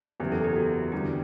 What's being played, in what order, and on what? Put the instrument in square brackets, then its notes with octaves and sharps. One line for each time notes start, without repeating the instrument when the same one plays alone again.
[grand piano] F#1 E2 B2 F#3 [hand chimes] G4
[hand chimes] A4
G4
F#4
[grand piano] E2 D3 G3 [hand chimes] G4